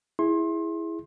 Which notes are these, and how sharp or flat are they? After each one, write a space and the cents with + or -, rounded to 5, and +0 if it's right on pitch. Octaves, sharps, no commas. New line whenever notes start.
E4 +0 G#4 -5 C6 +25